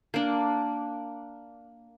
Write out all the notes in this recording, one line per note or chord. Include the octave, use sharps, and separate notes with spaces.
A#3 D4